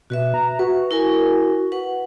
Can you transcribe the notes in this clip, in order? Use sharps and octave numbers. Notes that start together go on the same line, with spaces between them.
B2 F#4 B4 E5
A#5
F#4 B4
E4 A#4 G#5
B4 F#5